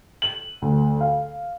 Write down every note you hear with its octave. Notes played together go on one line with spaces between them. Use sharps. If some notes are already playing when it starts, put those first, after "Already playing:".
F#7
D2
F5